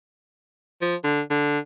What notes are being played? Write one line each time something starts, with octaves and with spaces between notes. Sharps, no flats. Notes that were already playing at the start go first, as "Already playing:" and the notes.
F3
D3
D3